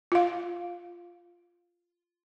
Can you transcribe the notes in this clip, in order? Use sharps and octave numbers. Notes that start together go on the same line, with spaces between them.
F4 F5